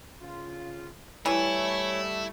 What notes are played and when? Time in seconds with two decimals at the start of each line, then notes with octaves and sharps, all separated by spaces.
0.21 C#3 F4
1.26 E3 G3 A3 E4 C#5